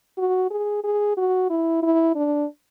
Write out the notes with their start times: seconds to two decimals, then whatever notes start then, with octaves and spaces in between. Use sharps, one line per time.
0.18 F#4
0.51 G#4
0.84 G#4
1.17 F#4
1.50 E4
1.83 E4
2.16 D4